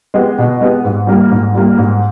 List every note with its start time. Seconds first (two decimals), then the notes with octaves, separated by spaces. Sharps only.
0.14 G#3 B3 G4
0.38 B2
0.61 G#3 B3 G4
0.84 G#2
1.07 G3 A#3
1.30 G#2
1.54 G3 A#3
1.78 G#2